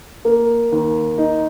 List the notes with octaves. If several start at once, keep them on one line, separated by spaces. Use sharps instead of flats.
A#3
D#2
D#4